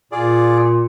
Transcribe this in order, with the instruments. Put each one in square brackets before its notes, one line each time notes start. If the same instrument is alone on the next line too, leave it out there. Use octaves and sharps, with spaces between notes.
[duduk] A#2 [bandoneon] F4 G#4 D5